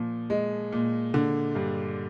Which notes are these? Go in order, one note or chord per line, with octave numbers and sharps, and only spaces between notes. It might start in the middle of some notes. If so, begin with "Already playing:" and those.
Already playing: A#2 F3
G#3
A#2
D3
G2